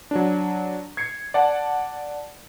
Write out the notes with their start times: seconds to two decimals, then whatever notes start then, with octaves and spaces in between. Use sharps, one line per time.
0.11 F#3 D4
0.97 G#6 C7 C#7
1.34 D5 F#5 A5